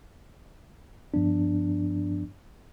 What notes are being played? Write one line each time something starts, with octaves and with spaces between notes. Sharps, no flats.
G2 F3 B3 D4